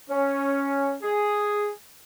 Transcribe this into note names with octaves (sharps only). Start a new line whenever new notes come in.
C#4
G#4